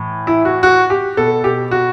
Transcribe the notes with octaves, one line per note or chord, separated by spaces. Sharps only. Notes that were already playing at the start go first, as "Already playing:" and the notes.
Already playing: A2 E3
E4
F#4
F#4
G4
B2 A4
G4
F#4